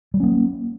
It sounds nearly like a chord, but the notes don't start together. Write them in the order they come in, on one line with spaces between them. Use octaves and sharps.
G3 F#3 C#4 A#3